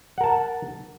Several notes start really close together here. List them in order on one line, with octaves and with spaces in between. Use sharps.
F#5 A#4 A5